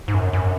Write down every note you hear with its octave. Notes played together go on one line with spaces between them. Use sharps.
G#2
F#2
F#2